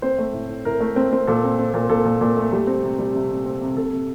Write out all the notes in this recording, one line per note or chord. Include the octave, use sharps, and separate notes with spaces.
C4 C5
A3
A2
A2
A2 A#4
A3
C4
C4
A#2 A4
C4
C4
A#2
A#2 A4
A#2
A#2
A3
G3
C4
C3
G3
C3
C3
C4
C3
C3 A4
C3